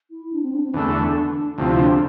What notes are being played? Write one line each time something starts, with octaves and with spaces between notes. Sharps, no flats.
E4
D4
C4
D4
C4
E2 D3 A3 D4
D2 C3 F3 E4
E4
D4